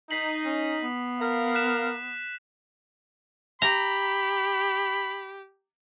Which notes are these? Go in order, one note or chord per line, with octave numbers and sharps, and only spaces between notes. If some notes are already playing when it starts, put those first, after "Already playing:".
D#4 B6 C7 F#7
C#4
B3
A#4 F5
F#6 B6 E7
G4 A#5 B5